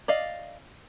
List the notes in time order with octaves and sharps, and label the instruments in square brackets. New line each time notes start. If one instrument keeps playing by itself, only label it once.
[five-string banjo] D5 D#5 F5